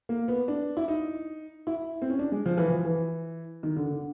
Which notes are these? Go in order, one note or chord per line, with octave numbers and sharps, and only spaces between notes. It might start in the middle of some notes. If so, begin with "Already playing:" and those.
A#3
B3
D4
E4
D#4
E4
C4
C#4
D4
G#3
F3
E3
F3
E3
D#3
D3
D3